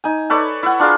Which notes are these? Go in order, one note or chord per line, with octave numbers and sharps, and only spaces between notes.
D#4 G#5
A4 B4 C#5 D5
E4 F#5
D4 F4 G#4 A#4